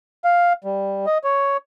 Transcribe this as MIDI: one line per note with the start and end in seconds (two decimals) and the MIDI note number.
0.25 0.53 77
0.64 1.06 55
1.07 1.18 75
1.24 1.57 73